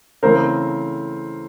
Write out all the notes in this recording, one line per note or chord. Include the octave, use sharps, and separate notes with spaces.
C#3 E3 A3 C4 A#4 C5